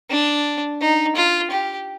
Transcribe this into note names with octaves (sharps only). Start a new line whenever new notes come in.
D4
D#4
F4
G4